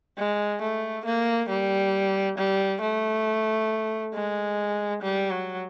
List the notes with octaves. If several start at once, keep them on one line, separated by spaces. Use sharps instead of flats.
G#3
A3
A#3
G3
G3
A3
G#3
G3
F#3